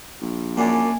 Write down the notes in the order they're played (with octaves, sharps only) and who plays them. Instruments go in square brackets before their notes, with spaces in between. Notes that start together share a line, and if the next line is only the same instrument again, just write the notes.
[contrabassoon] A#1
[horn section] F#2 D4 [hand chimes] A#3 G#5